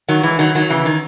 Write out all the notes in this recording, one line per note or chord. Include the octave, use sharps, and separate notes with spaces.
D#3 F#3
E3 G#3
D#3 F#3
D#3 F#3
C#3 E3
D#3